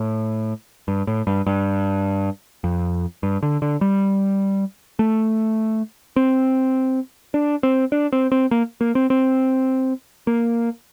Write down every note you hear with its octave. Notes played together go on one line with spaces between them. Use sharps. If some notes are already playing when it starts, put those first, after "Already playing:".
Already playing: A2
G2
A2
G2
G2
F2
G2
D3
D3
G3
A3
C4
D4
C4
D4
C4
C4
A#3
A#3
C4
C4
A#3